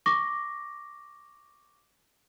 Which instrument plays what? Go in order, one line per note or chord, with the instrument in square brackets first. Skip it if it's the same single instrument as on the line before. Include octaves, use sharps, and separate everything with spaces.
[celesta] C#6 D6 A#6